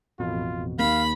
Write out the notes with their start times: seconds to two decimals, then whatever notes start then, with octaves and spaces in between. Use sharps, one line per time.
0.19 A1 F2 B2 F4
0.79 D#2 A#3 F5 B5